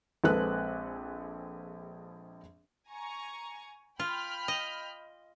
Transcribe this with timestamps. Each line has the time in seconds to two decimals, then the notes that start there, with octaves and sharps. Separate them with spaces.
0.24 A#1 G#3 C4 A4 B4 F#6
2.88 G#5 A#5 C#6
4.00 F4 G5 B5 F6
4.48 D#5